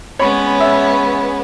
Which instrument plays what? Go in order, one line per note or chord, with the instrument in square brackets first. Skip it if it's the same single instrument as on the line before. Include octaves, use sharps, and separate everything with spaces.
[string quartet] G#3 B3 C#4 [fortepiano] C#5 B5
[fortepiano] E5